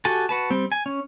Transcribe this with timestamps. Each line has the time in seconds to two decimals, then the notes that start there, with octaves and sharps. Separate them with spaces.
0.05 F#4 G4 A4 G#5 A5
0.29 F#4 B4 A5
0.50 G3 C4
0.72 G#5
0.86 C#4